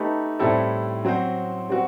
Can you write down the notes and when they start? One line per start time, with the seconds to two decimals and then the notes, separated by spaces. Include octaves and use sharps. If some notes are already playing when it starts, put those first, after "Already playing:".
Already playing: A3 D#4 G4 B4
0.39 A2 G3 C4 E4 A4
1.05 F#3 C4 F#4 C5
1.69 G3 C4 F#4